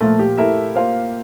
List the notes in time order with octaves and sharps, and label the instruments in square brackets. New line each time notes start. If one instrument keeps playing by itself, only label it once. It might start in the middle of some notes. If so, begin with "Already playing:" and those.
[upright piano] A#2 F3 A#3 F4 [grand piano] A3
[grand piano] G4
[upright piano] A3 E4 A#4 E5
A#3 F4 C5 F5